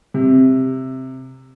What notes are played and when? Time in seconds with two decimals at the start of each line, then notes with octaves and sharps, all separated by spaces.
0.14 C3